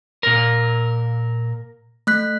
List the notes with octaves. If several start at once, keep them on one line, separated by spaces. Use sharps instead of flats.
A#2 A#4
A3 F#6 B6